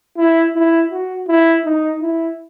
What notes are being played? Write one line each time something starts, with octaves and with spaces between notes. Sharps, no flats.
E4
E4
F#4
E4
D#4
E4